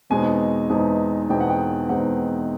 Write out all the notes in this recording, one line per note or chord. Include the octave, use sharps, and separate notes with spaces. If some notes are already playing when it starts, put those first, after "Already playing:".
E2 B2 G#3 C4 D#4 G#5
E2 B2 G#3 C4 D#4
E2 B2 G#3 C4 D#4 G5
F#5
G5
E2 B2 G#3 C4 D#4 F#5